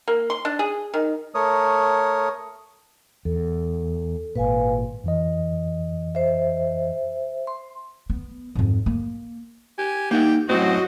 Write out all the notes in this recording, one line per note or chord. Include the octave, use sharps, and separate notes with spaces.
A#3
C6
D4
G#4
D#3
A3 A#4 C#5 D#6
E2 A4
G#1 A#2 B4 F5 G#5
F2 E3 D#5
C5 E5
C6
B3
F2 G#2
A#3
G4 G#5
A#3 D#4 F#5 G5
F#2 A2 C4 F#4 D#5